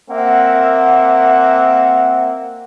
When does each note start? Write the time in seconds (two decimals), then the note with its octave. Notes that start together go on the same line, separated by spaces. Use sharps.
0.11 A#3 C4 E5 F#5